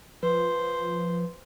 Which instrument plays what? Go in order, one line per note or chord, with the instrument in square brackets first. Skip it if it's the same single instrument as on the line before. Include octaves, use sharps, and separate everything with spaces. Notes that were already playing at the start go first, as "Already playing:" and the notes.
[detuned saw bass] F3 [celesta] B4 [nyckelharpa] C5